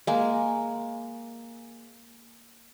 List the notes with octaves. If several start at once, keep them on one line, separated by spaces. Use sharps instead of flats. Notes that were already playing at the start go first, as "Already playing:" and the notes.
G#3 A#3